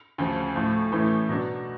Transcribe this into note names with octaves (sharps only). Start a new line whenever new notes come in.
D2 C#3 F3
A2 F3 A3
A2 E3 A3 C#4 E4
B2 F#3 B3 D4